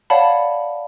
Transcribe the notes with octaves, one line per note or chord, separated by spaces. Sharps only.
C#5 D5 F5 F#5 A5 B5